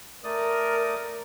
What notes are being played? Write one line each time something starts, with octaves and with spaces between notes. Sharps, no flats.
A3 A#4 D5 D#6